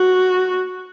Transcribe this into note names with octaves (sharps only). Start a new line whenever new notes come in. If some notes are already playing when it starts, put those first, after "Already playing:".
Already playing: F#4